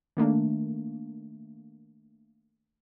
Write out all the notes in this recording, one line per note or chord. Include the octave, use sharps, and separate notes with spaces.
D#3 A3 A#3 D4